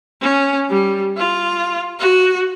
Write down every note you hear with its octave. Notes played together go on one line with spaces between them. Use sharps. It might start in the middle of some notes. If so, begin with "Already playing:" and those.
C#4
G3
F4
F#4